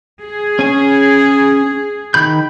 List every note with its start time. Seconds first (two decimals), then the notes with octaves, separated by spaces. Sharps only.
0.22 G#4
0.59 C#4 G#5
2.14 D#3 B5 G6